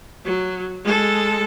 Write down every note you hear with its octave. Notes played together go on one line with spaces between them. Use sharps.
F#3
G#3 A4